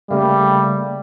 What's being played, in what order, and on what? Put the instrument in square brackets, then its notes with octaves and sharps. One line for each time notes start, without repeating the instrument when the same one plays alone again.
[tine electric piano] C#3 A3 A#3 [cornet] G3